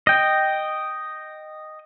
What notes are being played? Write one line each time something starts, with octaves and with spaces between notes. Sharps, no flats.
D#5 G5